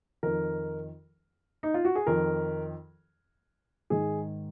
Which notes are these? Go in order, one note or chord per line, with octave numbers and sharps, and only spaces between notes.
F2 D#3 A#4
D#4
F4
F#4
G#4
F2 D#3 A#4
G#2 D#3 G#4